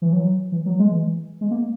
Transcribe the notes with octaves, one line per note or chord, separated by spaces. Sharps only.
E3
F#3
E3
F#3
G#3
E3
G#3
A#3